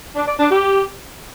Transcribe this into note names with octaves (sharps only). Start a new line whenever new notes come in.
D4
D5
D4
G4